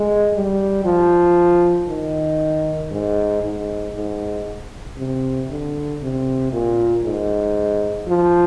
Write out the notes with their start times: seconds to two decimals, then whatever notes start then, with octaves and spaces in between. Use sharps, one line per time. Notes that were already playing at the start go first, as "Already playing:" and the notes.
Already playing: G#3
0.34 G3
0.85 F3
1.88 D#3
2.91 G#2
3.43 G#2
3.95 G#2
4.98 C3
5.50 D3
6.02 C3
6.52 A#2
7.05 G#2
8.07 F3